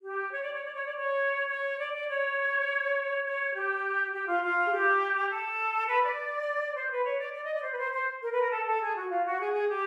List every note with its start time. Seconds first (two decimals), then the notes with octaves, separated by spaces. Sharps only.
0.02 G4
0.32 C#5
0.41 D5
0.52 C#5
0.63 D5
0.74 C#5
0.85 D5
0.96 C#5
1.48 C#5
1.78 D5
1.92 D5
2.07 C#5
3.25 C#5
3.54 G4
4.13 G4
4.26 F4
4.42 F4
4.66 G#4
4.71 G4
5.29 A4
5.87 B4
6.02 D5
6.75 C5
6.91 B4
7.05 C#5
7.19 D5
7.34 D5
7.44 D#5
7.53 D5
7.63 C5
7.71 B4
7.79 C5
7.92 C5
8.22 A#4
8.32 B4
8.42 A#4
8.51 A4
8.67 A4
8.81 G#4
8.95 F#4
9.10 F4
9.25 F#4
9.39 G#4
9.53 G#4
9.69 G4